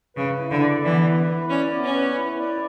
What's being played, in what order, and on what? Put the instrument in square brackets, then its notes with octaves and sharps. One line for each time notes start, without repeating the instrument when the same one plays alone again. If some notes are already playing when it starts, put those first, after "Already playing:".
[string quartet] C#3 [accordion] B4
[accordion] E4
[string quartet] D3
[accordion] D5
[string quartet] E3 [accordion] B3
[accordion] B4
E4
[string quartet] C#4 [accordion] D5
[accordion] B3
[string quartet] C#4
[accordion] B4
E4
D5